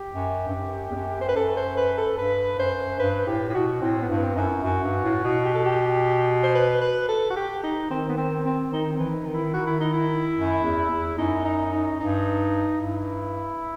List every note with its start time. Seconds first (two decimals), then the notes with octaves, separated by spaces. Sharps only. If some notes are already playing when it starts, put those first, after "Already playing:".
Already playing: G4
0.14 F#2
0.47 G2
0.55 F#2
0.91 E2
0.95 F#2
1.21 C5
1.29 B4
1.36 F#2 A4
1.56 C5
1.77 B4
1.98 A4
2.18 G2 B4
2.58 F#2 C5
2.99 G2 B4
3.27 A2 G4
3.49 A2 G4
3.54 B2 F#4
3.81 A2 C4
4.02 B3
4.09 G2
4.23 C4
4.35 F#2 D#4
4.43 E4
4.63 F#2 F#4
4.83 G2
5.04 A2
5.24 B2
5.45 G4
5.54 A4
5.65 G4
6.43 C5
6.55 B4
6.81 B4
7.08 A4
7.30 F#4
7.36 G4
7.63 D#4
7.90 D#3 C4
8.09 B3
8.17 C4
8.45 C4
8.72 D#3 D#4
8.92 C4
8.99 E3
9.13 D#4
9.26 D#3
9.33 E4
9.54 D#3 F#4
9.67 E4
9.80 D#4
9.93 E4
10.36 F#2
10.63 E2
10.90 E2
11.18 F#2 D#4
11.45 D#4
11.72 D#4
12.00 G2 D#4
12.81 G2 E4